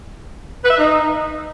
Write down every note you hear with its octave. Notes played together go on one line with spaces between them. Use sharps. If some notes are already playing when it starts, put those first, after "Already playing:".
B4
E5
D#4